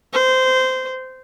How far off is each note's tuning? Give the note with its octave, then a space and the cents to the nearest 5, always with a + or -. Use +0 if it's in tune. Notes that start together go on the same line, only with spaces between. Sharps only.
C5 -15